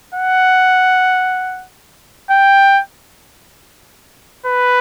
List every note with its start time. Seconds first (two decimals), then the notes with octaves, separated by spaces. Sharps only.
0.15 F#5
2.31 G5
4.45 B4